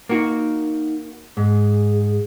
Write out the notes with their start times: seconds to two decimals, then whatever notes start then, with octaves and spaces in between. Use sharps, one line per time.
0.09 A#3 D#4 F#4
1.37 G#2 G#4